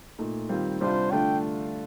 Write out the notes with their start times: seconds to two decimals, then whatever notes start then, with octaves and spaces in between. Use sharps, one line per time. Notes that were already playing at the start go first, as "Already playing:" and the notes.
0.18 A#2 A3 D#4
0.49 D#3 G3 C4 F4
0.81 C3 G3 D4 F4 C5
1.11 D3 A3 D4 F4 G5